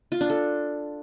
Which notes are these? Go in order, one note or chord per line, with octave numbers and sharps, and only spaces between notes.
F4
D4
A4